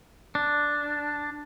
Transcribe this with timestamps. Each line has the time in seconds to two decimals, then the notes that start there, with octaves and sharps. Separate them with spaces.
0.35 D4